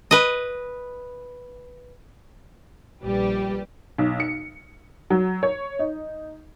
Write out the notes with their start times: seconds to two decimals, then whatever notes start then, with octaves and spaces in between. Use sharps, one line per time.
0.11 B4 D#5
3.02 A#1 G3 G4 B4
3.98 B1
4.20 C#7
5.10 F#3
5.43 C#5
5.79 D#4